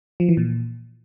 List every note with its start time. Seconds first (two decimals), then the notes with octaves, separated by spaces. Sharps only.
0.20 F3
0.29 E3
0.37 A#2